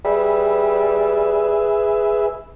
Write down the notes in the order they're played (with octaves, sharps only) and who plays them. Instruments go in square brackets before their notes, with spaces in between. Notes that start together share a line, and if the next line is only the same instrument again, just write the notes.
[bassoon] G3 [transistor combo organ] G#4 B4 E5